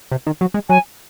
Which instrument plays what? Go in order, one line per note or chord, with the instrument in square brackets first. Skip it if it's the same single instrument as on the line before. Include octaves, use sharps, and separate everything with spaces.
[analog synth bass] C3
D#3
F#3
G#3
[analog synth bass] F#3 [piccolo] G#5